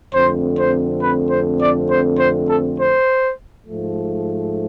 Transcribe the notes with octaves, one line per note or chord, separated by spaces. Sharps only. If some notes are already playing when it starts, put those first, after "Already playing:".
F2 D3 A3 C4 C5
C5
B4
C5
D5
C5
C5
A4
C5
G#2 F3 A3